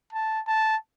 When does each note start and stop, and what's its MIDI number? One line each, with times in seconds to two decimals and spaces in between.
0.13 0.40 81
0.47 0.76 81